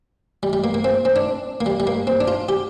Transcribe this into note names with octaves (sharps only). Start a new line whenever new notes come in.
G3
G3
A#3
A#3
C4
C4
D4
A#3
G3
G3
A#3
C4
D4
F4
G4